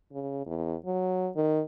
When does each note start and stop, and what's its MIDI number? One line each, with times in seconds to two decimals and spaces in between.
0.12 0.43 49
0.46 0.75 40
0.86 1.30 54
1.36 1.62 51